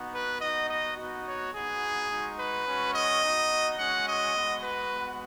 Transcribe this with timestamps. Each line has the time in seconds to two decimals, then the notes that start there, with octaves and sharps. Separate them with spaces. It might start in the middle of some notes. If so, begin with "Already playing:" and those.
Already playing: B3 D#4 F#4
0.13 B4
0.41 B3 D#4 F#4 D#5
0.69 D#5
0.98 B3 D#4 F#4
1.26 C#5
1.54 B3 D#4 F#4 G#4
2.10 G#3 D#4 F#4
2.39 B4
2.66 G#3 C#4 F#4
2.95 D#5
3.23 B3 D#4 F#4
3.79 G#3 C#4 F#4 F#5
4.07 D#5
4.35 G#3 B3 F#4
4.63 B4
4.92 G#3 B3 F#4